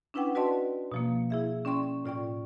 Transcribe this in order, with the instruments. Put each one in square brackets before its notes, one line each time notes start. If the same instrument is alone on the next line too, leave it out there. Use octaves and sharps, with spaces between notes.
[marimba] C#4 D4 E4 B4 F#5 G5
F#4 B4 D5 D#5 A5 C6
B2 F3 A#3
E4 G#4 E5
C#4 D5 G5 C6 C#6
A2 F4 D5 G5 C#6